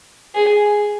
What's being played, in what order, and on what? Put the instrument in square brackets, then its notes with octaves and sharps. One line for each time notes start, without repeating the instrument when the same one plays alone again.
[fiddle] G#4